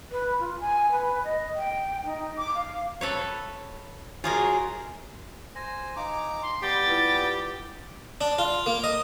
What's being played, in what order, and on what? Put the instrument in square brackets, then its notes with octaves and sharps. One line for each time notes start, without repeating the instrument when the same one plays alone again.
[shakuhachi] B4
F4
G#5
B4
D#5
G5
D#4
D6
F5
[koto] A4 B4 C#5
[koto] F4 G#4 A#4 [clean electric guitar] F#4 C#5 G#5
[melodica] C5 G#5 [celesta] A#6
[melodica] D#4 A#5 D6 [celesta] F5 G#5
[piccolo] C6
[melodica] G3 B3 G5 [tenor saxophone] G4 [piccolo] A6
[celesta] E4 F4 B4
[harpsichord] D4
F4
A#3
D#5